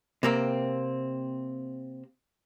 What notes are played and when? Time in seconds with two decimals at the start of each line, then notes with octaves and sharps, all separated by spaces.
0.23 C3 A#3 C4